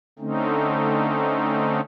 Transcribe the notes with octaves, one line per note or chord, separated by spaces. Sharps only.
D3 A3 C4 C#4 D#4